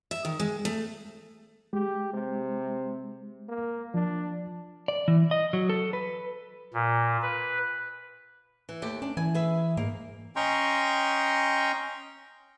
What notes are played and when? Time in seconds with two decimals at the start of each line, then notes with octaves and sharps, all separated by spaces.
0.11 E5
0.25 D#3
0.40 G#3
0.65 A3
1.73 G#3 G4
2.13 C3
3.49 A#3
3.94 F3 D4
4.88 D5
5.08 E3
5.31 D#5
5.53 F#3
5.69 A4
5.93 B4
6.74 A#2
7.22 B4
8.69 E3
8.82 D#2 A3 G4
9.02 C#4 D4
9.17 E3 G#5
9.34 G#4 B4 E5
9.77 G#2 A#3
10.36 C#4 D#5 G5 A#5 C6 C#6